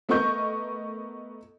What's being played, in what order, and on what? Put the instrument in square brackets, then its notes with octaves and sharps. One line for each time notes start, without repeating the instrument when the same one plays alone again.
[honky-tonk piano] A3 B3 A#4 D#5 C#6 G6